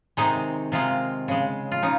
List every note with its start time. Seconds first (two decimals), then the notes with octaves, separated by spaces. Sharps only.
0.17 C3 D#3 G#3 D#4
0.72 C3 D#3 G#3 F4
1.28 C#3 G#3
1.72 F4
1.83 C#3 D#4